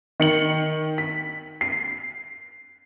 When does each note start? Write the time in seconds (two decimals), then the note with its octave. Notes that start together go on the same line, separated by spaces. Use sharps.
0.20 D#3 C#7 F#7
0.98 B6
1.61 C7